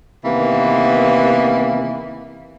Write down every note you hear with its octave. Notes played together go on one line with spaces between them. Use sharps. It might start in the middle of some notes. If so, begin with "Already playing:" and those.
C3 D#3 E3 A#3 B3